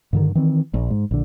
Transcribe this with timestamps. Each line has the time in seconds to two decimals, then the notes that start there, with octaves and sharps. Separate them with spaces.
0.13 G2 D3 D#3
0.35 D#3 E3 C4
0.74 A#1
0.90 G#2
1.11 A#1 D3